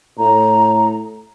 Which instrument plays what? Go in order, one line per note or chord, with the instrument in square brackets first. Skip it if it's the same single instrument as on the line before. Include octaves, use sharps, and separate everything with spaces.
[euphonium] A2 [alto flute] A#5